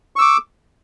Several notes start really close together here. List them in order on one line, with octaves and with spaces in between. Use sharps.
C#6 E6 D6